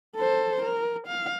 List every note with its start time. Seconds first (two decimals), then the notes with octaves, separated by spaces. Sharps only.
0.16 A4 C5
0.62 A#4
1.08 F5